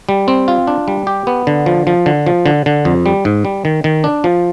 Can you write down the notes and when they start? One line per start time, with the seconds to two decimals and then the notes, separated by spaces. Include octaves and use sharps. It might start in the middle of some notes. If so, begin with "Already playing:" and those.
0.09 G3
0.28 C4
0.48 F4
0.67 D4
0.88 G3
1.07 G4
1.27 B3
1.47 D3
1.66 F3
1.87 F3
2.06 D3
2.26 F3
2.46 D3
2.66 D3
2.85 F2
3.06 G3
3.25 G#2
3.45 G3
3.65 D#3
3.84 D#3
4.04 D4
4.24 F3